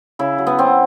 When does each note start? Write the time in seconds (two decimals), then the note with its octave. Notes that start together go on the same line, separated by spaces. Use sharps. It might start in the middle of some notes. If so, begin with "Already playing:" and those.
0.19 C#3 E4
0.38 F#3
0.47 B3
0.58 F#3 C4